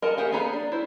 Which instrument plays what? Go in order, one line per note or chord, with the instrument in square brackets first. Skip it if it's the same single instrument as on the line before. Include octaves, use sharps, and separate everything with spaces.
[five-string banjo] A#4 D#5 F#5 A5
A#3 G4 F#5 G#5
A#3 B3 G#4 A#5 B5
D4
E4 C5